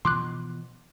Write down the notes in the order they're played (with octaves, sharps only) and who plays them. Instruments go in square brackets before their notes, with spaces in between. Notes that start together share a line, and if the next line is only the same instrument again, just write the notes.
[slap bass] B2 E3 F3 [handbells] C6 D6 F#6